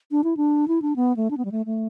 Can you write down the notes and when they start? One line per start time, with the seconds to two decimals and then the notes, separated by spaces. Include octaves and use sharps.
0.11 D4
0.24 E4
0.37 D4
0.68 E4
0.82 D4
0.96 B3
1.17 A3
1.31 D4
1.37 B3
1.45 G3
1.52 A3
1.66 A3